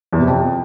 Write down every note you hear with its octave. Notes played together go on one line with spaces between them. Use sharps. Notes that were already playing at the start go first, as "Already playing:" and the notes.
E2
C3
F2